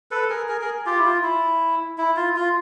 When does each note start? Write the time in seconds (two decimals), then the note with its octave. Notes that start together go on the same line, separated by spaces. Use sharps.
0.11 A4 B4
0.30 G#4 A#4
0.48 G#4 A#4
0.61 G#4 A#4
0.86 F4 G4
0.98 E4
1.04 F4
1.23 E4
1.98 E4
2.16 F4
2.36 F4